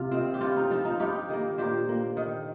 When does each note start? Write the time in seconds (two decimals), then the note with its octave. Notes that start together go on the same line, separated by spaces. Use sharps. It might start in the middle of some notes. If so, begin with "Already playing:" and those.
Already playing: C3 F4
0.12 D#3 C4
0.34 G4
0.41 G2 F4
0.57 D#4
0.70 F3 C4 F4
0.85 D#4
0.99 G2 D#4 G4
1.29 D#3 A#3
1.58 A#2 G4 C5
1.89 A#3
2.17 D#3